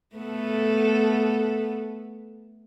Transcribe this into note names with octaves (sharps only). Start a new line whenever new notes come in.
A3 B3 A4